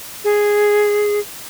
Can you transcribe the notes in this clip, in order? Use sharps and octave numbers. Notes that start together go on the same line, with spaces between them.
G#4